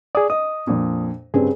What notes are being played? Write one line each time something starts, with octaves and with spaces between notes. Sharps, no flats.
G#4 D5 D#6
D#5 D#6
F2 A#2 D4
G2 C#3 C4 G#4